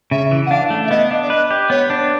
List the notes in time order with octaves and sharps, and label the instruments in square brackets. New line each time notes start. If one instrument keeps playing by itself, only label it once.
[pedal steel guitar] C#3 [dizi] E5
[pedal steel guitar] E3
[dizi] F#5
[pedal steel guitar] D4 [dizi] F5
[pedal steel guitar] A3
[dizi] E5
[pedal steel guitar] B3 [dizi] D#5
[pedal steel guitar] D4
[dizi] D5
[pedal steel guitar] B4 [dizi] D#5
[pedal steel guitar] G4
[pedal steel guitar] B3 [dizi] C#5
[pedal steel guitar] D4